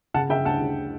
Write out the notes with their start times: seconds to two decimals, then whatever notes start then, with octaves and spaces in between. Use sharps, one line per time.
0.14 C#3 F#5 A5
0.29 C#3 E5 G5
0.45 D2 F#5 A5
0.61 C#3